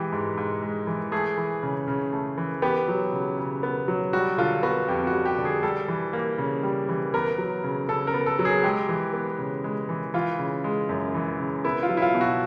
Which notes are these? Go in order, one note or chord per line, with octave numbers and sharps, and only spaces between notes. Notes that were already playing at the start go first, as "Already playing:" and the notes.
Already playing: E3 G#3 G4
G#2
G#2
G#3
E3
A3 G#4
E3
C#3
C#3
A3
E3
B3 G4
F#3
C#3
C#3
B3
F#3
G3 F#4
D3 F4
B3 F#4
F2 G4
F#4
G3
G4
D3
G#4
G3 A4
E3
A#3
C#3
G3
E3
B3 A#4
F#3
C#3
C#3 A4
A#4
B3
A4
F#3
G#4
G#3 G4
E3
B3
C#3
G#3
E3
E3 F4
C#3
G#3
F#2
E3
C#3
B3 E4
F4
F#3
E4
F4
B2
F#4